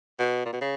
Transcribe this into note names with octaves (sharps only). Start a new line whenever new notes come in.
B2
A#2
B2
C#3